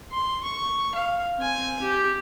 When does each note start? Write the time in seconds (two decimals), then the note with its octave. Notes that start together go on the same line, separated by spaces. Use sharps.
0.12 C6
0.43 C#6
0.95 F5
1.37 C4 G#5
1.82 G4